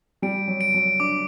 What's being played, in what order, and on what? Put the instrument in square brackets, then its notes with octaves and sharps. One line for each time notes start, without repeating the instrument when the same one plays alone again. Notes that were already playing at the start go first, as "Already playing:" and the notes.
[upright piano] G3 [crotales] D7
[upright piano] F#3
[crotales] D7
[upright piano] F#3
[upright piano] D4 [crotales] D6